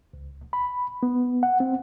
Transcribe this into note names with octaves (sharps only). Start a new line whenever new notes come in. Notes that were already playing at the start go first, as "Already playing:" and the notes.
C#2
B5
B3
F#5
C4